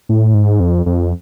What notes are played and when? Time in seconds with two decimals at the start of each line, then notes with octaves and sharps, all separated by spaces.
0.09 A2
0.34 G#2
0.60 F2
0.86 F2